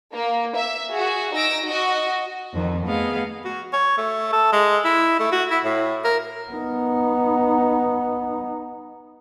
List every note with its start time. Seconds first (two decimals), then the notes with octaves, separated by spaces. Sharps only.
0.14 A#3
0.57 E5
0.91 F#4 G#4
1.34 D#4 E6 A#6 D7
1.65 F#4 D#5
2.54 F2 D#3
2.86 A3 B3 G#4 D#5 F5
3.45 F#4
3.73 C#5
3.98 A3
4.33 A4
4.53 G#3
4.85 E4
5.20 A3
5.32 F#4
5.51 E4
5.64 A2
6.05 A#4
6.51 B3 D#4